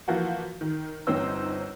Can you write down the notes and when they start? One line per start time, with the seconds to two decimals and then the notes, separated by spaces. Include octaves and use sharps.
0.08 E3 F3 A#3 F#4
0.61 D#3
1.07 G1 C4 C#4 D#4 C5 E6